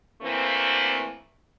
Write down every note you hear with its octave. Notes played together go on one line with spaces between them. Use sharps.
D2 E3 A3 A#3 C4